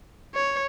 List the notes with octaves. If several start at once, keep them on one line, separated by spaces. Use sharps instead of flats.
C#5